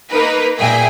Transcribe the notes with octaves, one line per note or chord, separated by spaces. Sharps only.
A#3 D#4 A#4 B4
A#2 G#4 E5 G5 G#5